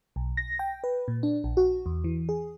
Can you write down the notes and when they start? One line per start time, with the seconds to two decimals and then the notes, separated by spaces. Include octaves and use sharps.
0.16 B1
0.37 A#6
0.59 G5
0.84 B4
1.08 A#2
1.23 D4
1.44 A#1
1.57 F#4
1.86 E2
2.04 E3
2.29 G#4